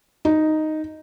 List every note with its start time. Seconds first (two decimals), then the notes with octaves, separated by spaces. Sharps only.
0.25 D#4